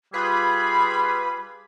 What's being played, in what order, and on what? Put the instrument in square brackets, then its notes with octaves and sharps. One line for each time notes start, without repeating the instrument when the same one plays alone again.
[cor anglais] G3 [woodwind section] F4 G#4 [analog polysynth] B4 [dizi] B5